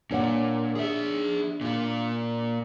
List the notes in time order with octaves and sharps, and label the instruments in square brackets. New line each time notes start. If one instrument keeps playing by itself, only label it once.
[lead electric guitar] A#2 [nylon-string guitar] D4 C#5 F#5
[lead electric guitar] G#4 E5
A#2 F4